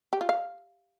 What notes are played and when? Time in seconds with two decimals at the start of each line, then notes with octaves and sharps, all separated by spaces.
0.13 G4
0.21 F4
0.29 F5